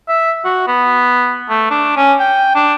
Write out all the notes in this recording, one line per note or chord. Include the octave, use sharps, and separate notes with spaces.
E5
F#4
B3
A3
D4
C#4
G5
D4